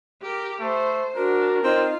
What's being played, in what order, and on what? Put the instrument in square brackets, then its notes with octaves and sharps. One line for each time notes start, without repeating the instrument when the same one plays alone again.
[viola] G4 A#4
[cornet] A3 [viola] C5
[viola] D4 [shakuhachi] F#4 [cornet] A#4
[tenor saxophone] C4 [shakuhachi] D#4 [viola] F4 F5